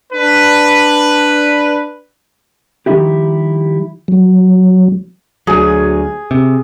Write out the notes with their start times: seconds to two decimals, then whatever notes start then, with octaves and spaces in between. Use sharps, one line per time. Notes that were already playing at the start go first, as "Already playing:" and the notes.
0.13 D4 B4
2.86 D#3 F3 G3 D#4 E4 G4
4.08 F#3
5.47 D2 F#3 G#4
6.31 C3